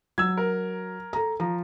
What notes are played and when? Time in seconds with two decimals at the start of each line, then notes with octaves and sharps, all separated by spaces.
0.18 F#3 E6 G#6
0.37 A#4
1.13 A4 A#5
1.40 F3 A#5